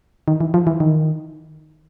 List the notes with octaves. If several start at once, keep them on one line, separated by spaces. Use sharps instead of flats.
D#3
E3
F3
E3
D#3